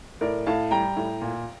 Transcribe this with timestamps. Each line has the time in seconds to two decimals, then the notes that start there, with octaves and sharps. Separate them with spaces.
0.21 A2 A#4 D5
0.46 A2 F5 A5
0.71 G3 G5 A#5
0.96 A2
1.21 A#2